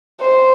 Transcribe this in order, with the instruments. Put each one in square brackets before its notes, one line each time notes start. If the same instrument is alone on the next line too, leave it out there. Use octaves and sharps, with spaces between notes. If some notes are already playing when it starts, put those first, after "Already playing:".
[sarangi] C5